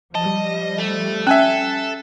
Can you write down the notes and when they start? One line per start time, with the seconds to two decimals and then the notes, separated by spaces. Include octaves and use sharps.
0.15 F3 G3 D#5 A5
0.78 A3
1.27 C#4 A4 E5 G#5 F#6